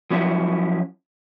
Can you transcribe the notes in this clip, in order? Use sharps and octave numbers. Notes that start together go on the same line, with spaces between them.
F3 F#3 C#4 E4